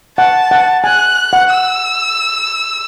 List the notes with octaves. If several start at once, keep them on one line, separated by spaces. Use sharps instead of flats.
F#5 A5
F#5
G#5 F#6
F#5
E6